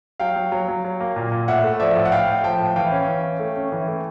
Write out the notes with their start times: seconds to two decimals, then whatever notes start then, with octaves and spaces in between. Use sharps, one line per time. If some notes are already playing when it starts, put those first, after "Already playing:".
0.20 F#3 F5 G5
0.36 F#3
0.52 F#3
0.68 F#3
0.85 F#3
1.00 A#3
1.16 A#2
1.32 A#2
1.48 A2 E5 F#5
1.64 A3
1.80 F3 D5 E5
1.96 A2
2.05 F#5
2.12 A2 F5 G5
2.28 A2
2.44 F3 G5 A5
2.60 A2
2.76 E3 F5 G5
2.92 C#4
3.07 E3
3.24 C#4
3.40 A3
3.56 C#4
3.72 E3
3.88 A3